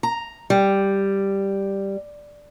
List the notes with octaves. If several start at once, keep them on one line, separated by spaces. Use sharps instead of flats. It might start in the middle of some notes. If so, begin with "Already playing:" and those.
A#5
G3